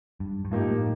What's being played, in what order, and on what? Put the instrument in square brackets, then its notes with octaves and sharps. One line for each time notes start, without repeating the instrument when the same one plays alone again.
[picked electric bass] G2
G2
[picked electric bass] G#2 [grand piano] F3 A#3 D#4 G4
[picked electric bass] A2